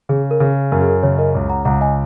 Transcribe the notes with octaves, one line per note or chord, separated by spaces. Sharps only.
C#3 G#4
A#4
C#3 G#4
F#2 A#4
G#4
A#4
C#3 C#5
A#4 D#5
C#2
F#5 A#5
C#2 F#5 A#5
D#5 G#5